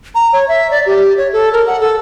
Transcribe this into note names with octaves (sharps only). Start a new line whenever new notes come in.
A#5
C#5
E5
D5
G4
C#5
A4
A#4
F#5
A4